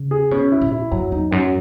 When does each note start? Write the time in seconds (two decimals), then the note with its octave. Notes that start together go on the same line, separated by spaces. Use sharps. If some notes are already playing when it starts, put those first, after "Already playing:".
Already playing: C#3
0.11 G#4
0.31 B2 C#4
0.52 E4
0.61 A#2
0.72 E4
0.91 F#2 F#3
1.12 E2 D#4
1.31 F#2 F#3